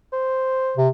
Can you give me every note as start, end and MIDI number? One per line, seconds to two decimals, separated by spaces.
0.13 0.83 72
0.77 0.89 48